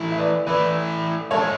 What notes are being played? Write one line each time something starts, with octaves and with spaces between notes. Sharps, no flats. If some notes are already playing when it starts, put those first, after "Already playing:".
Already playing: E3 A3 E4
E5
B4 D5
E3 A3 E4 B4 D5
G#2 G#3 C#4 A4 C#5